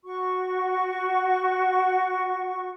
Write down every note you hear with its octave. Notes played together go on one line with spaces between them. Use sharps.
F#4 C#6